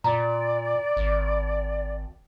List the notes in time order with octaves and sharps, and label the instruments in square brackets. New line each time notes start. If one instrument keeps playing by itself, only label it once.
[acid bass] A#2 [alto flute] D5 [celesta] A#5
[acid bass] G#1